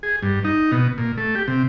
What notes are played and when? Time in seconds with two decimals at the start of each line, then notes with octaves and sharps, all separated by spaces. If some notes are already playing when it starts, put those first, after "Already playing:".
0.03 G#4
0.22 G2
0.44 D#4
0.72 B2
0.98 A#2
1.18 A3
1.35 G4
1.48 C3